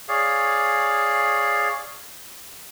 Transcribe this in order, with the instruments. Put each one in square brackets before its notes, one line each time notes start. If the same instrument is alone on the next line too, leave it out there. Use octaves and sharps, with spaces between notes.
[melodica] G#4 C#5 D5 F5